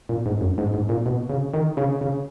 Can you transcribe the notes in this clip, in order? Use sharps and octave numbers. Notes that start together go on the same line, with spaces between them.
A#2
G#2
F#2
G#2
G#2
A#2
B2
C#3
D#3
C#3
C#3